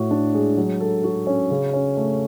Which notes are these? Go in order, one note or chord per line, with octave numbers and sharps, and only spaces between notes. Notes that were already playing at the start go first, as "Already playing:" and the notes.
Already playing: A2 F#4
D4
G#3
F#3
A4
F#4
C#4
C#3
C#4
A3